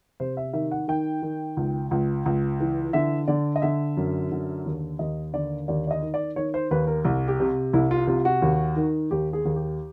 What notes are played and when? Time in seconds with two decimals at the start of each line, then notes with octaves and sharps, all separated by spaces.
0.20 C3 C5
0.37 E5
0.53 D#3 E5
0.71 F#5
0.88 D#3 G5
1.22 D#3
1.57 C#2
1.91 C#2
2.26 C#2
2.60 E3
2.93 D3 E5
3.28 D3 D5
3.56 D#5
3.62 D3 E5
3.97 F#2
4.32 D3
4.66 D#2
4.99 D#2 D#5
5.33 D3 D5
5.68 D#2 D5
5.87 D5
5.91 D#5
6.02 D#3
6.14 D5
6.36 D#3 C#5
6.54 C5
6.71 D#2 B4
6.87 A#4
7.05 C2
7.28 G4
7.40 C3
7.73 C2 E4
7.91 F4
8.07 C3 F4
8.25 F#4
8.42 D#2
8.76 D#3
9.11 D#2 G4
9.33 G#4
9.45 D#2
9.56 G4